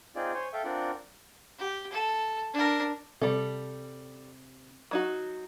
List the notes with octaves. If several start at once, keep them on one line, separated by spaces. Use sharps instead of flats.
C4 D#4 F4 G#4 D5
C5 C#5 G#5 C6
A4 E5 F5 G5
C4 D4 F4 A#4 D5 F#5
G4
A4
D4 A#4
C3 G3 A4
F#3 D#4 F#4